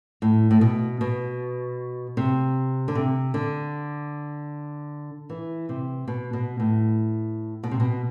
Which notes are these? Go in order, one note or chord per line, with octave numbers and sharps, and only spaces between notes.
A2
A2
B2
B2
C3
D3
C3
D3
E3
C3
B2
B2
A2
B2
C3
B2